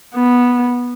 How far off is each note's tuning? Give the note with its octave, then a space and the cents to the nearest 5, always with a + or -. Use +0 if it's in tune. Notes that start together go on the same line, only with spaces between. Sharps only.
B3 -10